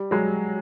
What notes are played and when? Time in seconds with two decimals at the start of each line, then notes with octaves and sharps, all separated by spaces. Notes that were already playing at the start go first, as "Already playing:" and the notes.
Already playing: G3
0.11 F#3 G#3